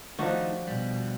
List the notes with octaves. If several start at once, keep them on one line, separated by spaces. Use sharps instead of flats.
D#3 F3 A3 D4 D#4 F#4
B2 G3